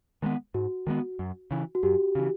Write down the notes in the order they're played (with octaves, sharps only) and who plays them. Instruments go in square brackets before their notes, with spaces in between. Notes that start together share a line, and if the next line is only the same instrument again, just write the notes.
[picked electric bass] D#3 G#3 B3
[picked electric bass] G#2 [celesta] F#4
[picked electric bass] D#3 G#3 B3
F#2
C#3 E3
[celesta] F#4
[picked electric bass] F#2 [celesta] G4
[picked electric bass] C#3 E3